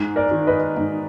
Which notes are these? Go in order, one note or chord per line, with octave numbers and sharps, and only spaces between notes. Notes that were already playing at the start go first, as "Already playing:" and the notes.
Already playing: G#2
A#4 D5
D#3
B4 D#5
G#2